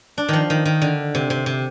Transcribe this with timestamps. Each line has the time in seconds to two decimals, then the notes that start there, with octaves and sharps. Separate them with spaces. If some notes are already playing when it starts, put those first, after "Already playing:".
0.18 D4
0.29 D#3 F3
0.50 D#3
0.65 D#3
0.82 D3
1.15 C3
1.30 C3
1.46 C3